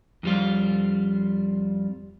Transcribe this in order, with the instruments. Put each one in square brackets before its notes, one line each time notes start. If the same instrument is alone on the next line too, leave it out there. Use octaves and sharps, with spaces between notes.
[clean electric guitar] F2 G3 F4